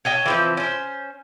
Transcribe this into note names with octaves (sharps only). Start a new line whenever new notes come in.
C#5 D#5 G5 A5
E3 F3 C4
C#4 C5